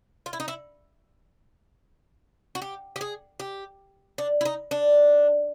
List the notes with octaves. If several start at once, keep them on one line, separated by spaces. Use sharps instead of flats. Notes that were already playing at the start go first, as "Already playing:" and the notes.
F4
E4
D#4
E4
F#4
G4
G4
G#4
G4
D4
E4
D#4
D4